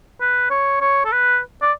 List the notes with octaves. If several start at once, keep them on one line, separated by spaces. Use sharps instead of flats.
B4
C#5
C#5
A4
B4
D5